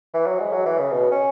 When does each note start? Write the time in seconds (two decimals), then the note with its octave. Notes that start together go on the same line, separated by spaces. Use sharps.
0.14 E3
0.26 F#3
0.40 G#3
0.53 F#3
0.66 E3
0.79 C#3
0.92 B2
1.11 C#4